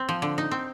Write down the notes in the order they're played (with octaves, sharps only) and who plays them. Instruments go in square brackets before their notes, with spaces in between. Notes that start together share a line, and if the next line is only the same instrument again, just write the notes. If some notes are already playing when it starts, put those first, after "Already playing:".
Already playing: [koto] C4
F3
D3
D#4
C4